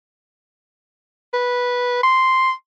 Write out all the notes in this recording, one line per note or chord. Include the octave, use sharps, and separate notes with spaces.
B4
C6